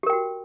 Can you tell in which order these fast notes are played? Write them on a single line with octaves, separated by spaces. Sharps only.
G4 A#4 G5 F#4